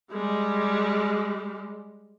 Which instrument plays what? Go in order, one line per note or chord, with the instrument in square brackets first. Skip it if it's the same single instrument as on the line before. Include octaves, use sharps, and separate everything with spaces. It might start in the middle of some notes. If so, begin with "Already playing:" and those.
[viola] G3 G#3